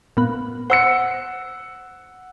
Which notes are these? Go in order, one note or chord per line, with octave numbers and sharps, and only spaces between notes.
A#2 B3
C5 F#5 E6 C#7